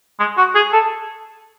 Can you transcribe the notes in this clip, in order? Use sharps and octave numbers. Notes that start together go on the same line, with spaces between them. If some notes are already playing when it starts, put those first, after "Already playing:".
G#3
F#4
G#4
A4